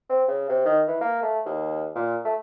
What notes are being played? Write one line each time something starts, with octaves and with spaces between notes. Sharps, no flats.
C4
C#3
C3
D#3
E3
A#3
A3
D#2
A#2
A3